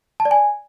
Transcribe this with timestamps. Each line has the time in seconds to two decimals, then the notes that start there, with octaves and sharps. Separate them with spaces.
0.20 A5
0.25 D5
0.31 G#5